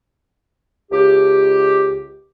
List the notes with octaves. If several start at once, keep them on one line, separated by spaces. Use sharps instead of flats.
C#2 G4